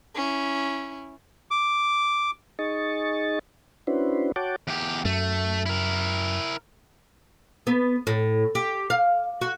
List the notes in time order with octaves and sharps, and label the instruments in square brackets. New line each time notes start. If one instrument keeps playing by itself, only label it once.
[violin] C#4 E4
[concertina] D6
[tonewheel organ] D#4 G#4 D#5 C#6 A6
C#4 D4 E4 F#4 B4 C5
F#4 C#5 F#5 G5 A5 D6
[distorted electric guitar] E2 G4
[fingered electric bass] F#2 [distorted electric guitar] A3
[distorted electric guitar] E4 A#4
[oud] B3
A2
G4
F5
F#4